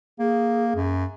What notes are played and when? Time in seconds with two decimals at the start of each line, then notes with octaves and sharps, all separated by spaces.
0.19 A#3 G#4
0.75 F#2